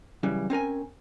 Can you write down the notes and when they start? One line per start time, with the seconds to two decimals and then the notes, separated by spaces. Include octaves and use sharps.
0.23 F#2 C#3 E3 G3
0.50 C4 C#4 A#4 G#5